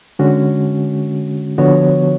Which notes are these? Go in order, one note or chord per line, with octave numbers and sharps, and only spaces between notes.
D3 G#3 C#4 F#4
D3 F3 B3 F#4 C#5